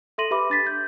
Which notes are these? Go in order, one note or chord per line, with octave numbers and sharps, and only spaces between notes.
A4 E5 C6 A#6 D#7 F#7
G4 B4 E5 B5 D6
D4 A6 B6
G6